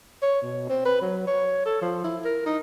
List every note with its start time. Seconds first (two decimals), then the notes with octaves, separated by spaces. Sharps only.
0.22 C#5
0.42 B2
0.69 C4
0.85 B4
1.01 F#3
1.27 C#5
1.65 A4
1.81 F3
2.04 E4
2.25 A#4
2.46 D#4